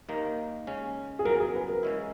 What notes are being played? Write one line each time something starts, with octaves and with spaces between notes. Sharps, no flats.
D#2 D#3 A#3 D#4
C#3 G#3 C#4
G#4
E2 C#3 F#3 A#4
G#4
B4
A#4
C#3 G#3 C#4 E4